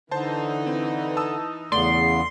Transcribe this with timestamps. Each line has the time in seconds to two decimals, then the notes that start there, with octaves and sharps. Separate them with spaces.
0.11 D3 E3 D#4 C5 A5
0.67 C4
1.17 A5 D#6 E6
1.72 E2 C#3 A3 B3 D5 C6